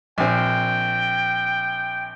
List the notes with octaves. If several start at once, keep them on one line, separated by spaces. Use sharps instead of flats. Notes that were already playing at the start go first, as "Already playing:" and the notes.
A#1 C4 G5